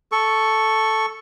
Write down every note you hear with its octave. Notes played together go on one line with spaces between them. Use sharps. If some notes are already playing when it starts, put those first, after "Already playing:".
A4 C#6